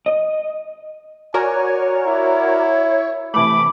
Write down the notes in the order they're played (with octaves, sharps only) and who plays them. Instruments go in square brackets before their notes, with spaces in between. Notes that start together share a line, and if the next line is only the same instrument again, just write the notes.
[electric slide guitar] D#5
[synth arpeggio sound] F#4 A#4 D5 [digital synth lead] C#5 [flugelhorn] G#5
[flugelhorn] E4
[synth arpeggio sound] C3 E3 A3 [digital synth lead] B5 [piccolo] D6